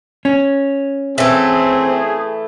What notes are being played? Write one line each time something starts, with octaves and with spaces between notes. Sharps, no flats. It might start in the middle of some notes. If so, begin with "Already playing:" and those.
C#4
E3 A3 C4 G#4